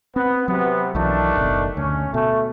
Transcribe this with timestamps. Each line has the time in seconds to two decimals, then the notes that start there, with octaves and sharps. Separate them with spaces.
0.16 B3 C4
0.48 C3 F#3 B3
0.95 B1 D#3 E3 F#3 A3 D4
1.36 F#1 B2
1.77 D2 C#4
2.14 B2 A3